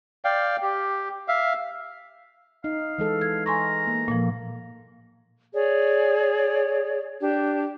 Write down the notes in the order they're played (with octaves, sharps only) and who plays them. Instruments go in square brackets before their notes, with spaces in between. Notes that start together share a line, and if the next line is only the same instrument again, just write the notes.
[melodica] D5 F5 G5
G4
E5 F5
[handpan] D#4 [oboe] F5
[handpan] E3 G#3 A4
[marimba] G#6
[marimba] G#5 C6 C#6 [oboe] A#5
[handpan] A#3
[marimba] A#2 F3 [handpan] A#3
[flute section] G#4 C#5 D5
D4 G4